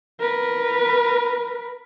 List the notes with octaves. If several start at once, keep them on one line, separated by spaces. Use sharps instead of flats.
A#4 B4